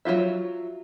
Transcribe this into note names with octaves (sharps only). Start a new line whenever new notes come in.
F#3 C#4 F4 E5